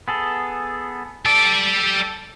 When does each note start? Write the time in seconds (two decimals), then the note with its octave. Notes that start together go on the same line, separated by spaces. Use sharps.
0.08 B3 G#4 A4
1.26 G3 A4 D5